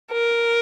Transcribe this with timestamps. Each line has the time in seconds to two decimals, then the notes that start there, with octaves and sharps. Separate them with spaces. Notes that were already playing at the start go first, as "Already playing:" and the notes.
0.13 A#4